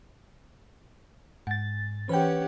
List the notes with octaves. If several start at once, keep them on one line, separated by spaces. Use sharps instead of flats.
G#2 F#5 A6
E3 C#4 G4 B4 F#5 G5